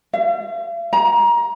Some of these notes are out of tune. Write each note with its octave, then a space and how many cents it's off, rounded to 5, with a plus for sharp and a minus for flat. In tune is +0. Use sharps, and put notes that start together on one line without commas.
F5 -45
A#5 +25